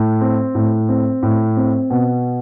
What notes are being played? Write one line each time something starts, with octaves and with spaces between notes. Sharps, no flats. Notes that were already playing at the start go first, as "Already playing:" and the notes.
Already playing: A2
C4
A2
C4
A2
C4
B2